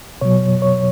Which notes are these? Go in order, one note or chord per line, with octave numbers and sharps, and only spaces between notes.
B2 F#3 C#5
C#5